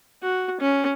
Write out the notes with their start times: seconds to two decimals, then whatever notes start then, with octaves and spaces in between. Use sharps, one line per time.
0.23 F#4
0.61 C#4